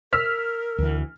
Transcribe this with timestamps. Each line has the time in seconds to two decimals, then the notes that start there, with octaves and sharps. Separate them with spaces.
0.13 A#4 E6 F6 B6
0.78 D2 E3